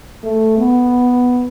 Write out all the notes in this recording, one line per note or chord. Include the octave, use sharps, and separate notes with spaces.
A3
B3